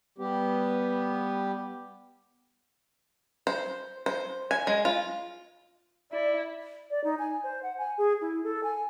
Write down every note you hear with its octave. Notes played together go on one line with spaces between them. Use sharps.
G3 B3 G4
C5
C5
G#5
G#3
F4
E4 D5
D5
D#4
G#5
C5
F#5
G#5
G#4
E4
A4
G#5